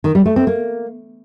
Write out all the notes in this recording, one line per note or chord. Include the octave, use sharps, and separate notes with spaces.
D#3
G3
A3
C4
A#3